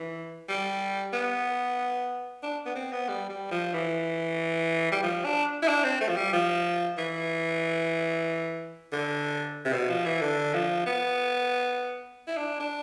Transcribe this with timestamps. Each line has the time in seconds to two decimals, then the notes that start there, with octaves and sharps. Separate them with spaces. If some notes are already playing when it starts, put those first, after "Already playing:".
Already playing: E3
0.48 G3
1.13 B3
2.43 D4
2.66 B3
2.75 C4
2.92 B3
3.09 G3
3.30 G3
3.51 F3
3.73 E3
4.92 G3
5.02 F3
5.25 D4
5.62 E4
5.68 D4
5.84 C4
6.01 A3
6.08 F3
6.16 G3
6.33 F3
6.98 E3
8.92 D3
9.65 C3
9.73 B2
9.89 F3
10.05 E3
10.21 D3
10.53 F3
10.87 B3
12.27 E4
12.37 D4
12.60 D4